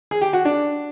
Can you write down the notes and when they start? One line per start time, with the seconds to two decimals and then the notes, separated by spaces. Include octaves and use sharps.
0.11 G#4
0.21 G4
0.33 F#4
0.45 D4